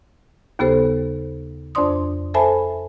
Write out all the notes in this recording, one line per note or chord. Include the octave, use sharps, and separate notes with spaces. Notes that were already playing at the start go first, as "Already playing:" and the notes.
D#2 C#3 B3 G4 A4 C5
F2 D4 C5 D5 C6 D#6
A4 C5 E5 G#5 A5 B5